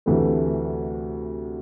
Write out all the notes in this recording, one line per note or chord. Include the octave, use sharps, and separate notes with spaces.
D2 C3 E3 A3